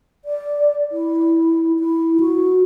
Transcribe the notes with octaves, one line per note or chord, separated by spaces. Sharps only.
D5
E4
E4
F#4